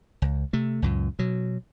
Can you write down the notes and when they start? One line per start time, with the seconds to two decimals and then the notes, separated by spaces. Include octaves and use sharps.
0.22 C#2
0.53 C3 A3
0.82 C#2 F#2 A#2
1.19 B2 F#3